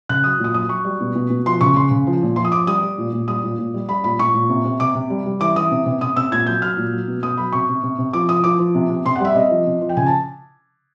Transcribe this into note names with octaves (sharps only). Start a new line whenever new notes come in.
C#3 F#6
F#3 D#6
A#2
D#6
F#3 D#6
F#3 C#6
G3
B2
B2
B2
F3 C6
C#3 C#6
C#3 C6
C#3
F3
A#2
F3 C6
D#6
F3 D6
G3 D#6
G3
A#2
A#2
G3 D#6
A#2
A#2
G3
G3 B5
A#2 B5
A#2 C#6
A#2
C3
C3
C3 D6
C3
G3
G3
E3 D6
E3 D#6
C3
C3
C3 D#6
C3 E6
A#2 G#6
F#3 G6
F#3 F6
A#2
F#3
B2
B2 D#6
F#3 B5
C3 C#6
C3
C3
C3
F3 D6
F3 D#6
F3 D6
F3
C3
C3
C3 C6
F#5
G3 E5
C3 D#5
F3
C3
F3
G5
C#3 G#5
A5